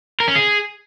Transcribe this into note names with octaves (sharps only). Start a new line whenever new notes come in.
A#4
C#4
G#4